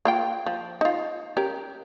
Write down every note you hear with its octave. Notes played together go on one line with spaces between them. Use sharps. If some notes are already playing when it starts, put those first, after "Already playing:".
A#3 F4 G5
F3
D#4 F4
C#4 G4 A#4